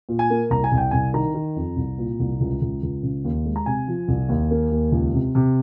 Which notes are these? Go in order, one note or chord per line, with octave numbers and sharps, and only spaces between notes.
A#2
G#5
A#3
C2 A#5
G#5
C2
G5
C2 G#5
D#3 A#5
D#3
F2
C2
A#2
C2
C#2
C#2
C#2
C#3
D#2
G#3
A#5
C3 G#5
F3
C2
D#2
A#3
D#2
C#2
C3
C3